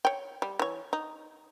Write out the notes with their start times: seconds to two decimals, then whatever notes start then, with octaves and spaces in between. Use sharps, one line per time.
0.05 C#5 G5
0.42 G3
0.59 E3 C#5
0.93 D#4